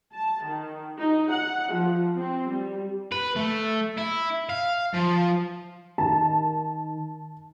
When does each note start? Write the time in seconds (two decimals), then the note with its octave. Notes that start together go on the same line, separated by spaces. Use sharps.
0.12 A5
0.44 D#3
0.98 D#4
1.31 F#5
1.72 F3
2.18 C4
2.50 G3
3.12 B4
3.36 A3
3.98 E4
4.49 F5
4.94 F3
5.98 D#3 A5